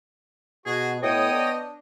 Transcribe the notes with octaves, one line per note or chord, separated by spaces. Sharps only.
B2 F#4 G#4
A2 B3 C#5 D#5 G5 D#6
D4